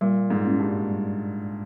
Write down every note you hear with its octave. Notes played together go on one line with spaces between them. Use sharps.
A#2 G3
G#2
A#3 C#4 E4
G2
G3